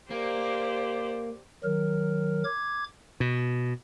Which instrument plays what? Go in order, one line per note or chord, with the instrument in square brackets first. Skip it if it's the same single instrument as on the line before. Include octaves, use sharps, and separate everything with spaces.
[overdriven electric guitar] A#3 [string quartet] G4 C5 D5
[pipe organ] D#3 F#3 A#4
D6 G#6
[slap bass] B2